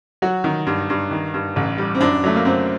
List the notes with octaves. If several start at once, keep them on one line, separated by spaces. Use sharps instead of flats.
F#3 F#4
D#3
G2
G2
D#3
G2
A1
G3
C4
F#2 D4
F#3 A3
A#3
F#2 C4